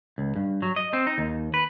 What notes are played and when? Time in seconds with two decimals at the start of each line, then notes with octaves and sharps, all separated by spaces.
0.18 C#2
0.36 G2
0.62 F#3
0.76 D#5
0.93 C4
1.07 D#4
1.18 D#2
1.54 B4